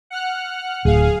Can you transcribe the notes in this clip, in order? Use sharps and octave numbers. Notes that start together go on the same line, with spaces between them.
F#5 F6 F#6
D1 G#4 F5